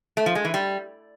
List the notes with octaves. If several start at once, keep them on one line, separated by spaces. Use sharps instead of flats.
A3
F3
G#3
E3
G3